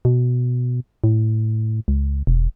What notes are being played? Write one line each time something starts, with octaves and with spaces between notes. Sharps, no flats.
B2
A2
C#2
E1